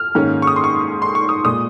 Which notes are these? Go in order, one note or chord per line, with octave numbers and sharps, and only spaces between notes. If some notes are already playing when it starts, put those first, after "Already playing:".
Already playing: F6
G#2 D#3 A#3 C#4
C#6
D#6
C6
C#6
C6
C#6
D#6
A#2 G#3 D#6